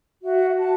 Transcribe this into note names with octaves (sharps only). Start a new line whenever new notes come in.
F#4 E5
F#4 A5